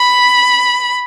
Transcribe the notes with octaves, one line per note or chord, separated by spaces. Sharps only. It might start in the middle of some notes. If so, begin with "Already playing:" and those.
Already playing: B5